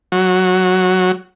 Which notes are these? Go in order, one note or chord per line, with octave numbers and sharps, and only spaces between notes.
F#3